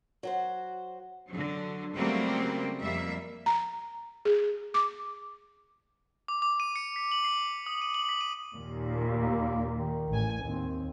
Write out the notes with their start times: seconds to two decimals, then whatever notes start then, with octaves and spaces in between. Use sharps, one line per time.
0.23 F#3 F#4 C5
1.30 D3 F#3
1.94 C#3 F#3 G3 A3 A#3 C4
2.83 F2 G3 A#3 E5
3.46 A#5
4.25 G#4
4.74 D6
6.28 D6
6.42 D6
6.60 D#7
6.76 C#7
6.96 B6
7.12 F#7
7.24 C7
7.66 D#6
7.82 D#7
7.94 F#7
8.09 B6
8.21 D#7
8.54 D#2 A#2
9.19 A#3
9.72 D#3
10.09 A1 G#5
10.43 D#2 C4